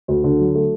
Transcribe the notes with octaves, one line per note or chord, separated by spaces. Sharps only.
D2
D3
F#3
A3